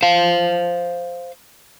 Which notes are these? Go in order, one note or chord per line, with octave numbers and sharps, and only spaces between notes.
C5 F5